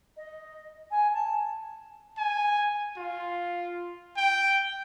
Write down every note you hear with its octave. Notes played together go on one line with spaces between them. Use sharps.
D#5
G#5
A5
G#5
F4
G5